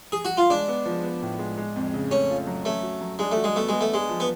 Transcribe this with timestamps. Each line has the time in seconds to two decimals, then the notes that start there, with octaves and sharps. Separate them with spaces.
0.12 G#4
0.25 F#4
0.37 F4
0.50 G#3 D4
0.68 B3
0.86 F3
1.03 B3
1.22 A2
1.39 G#3
1.57 G#3
1.76 F2
1.94 C#3
2.11 A3 C#4
2.30 F4
2.47 F#3
2.65 A3 C#4
2.83 F#4
3.01 F#3
3.19 G#3 D4
3.32 A3
3.37 F#4
3.44 G#3
3.55 A3 B3
3.69 G#3 B3
3.81 A3
3.91 G#3 D4
4.09 F3
4.20 B3